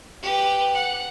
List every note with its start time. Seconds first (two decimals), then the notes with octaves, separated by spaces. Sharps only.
0.22 G4 B4
0.74 F#5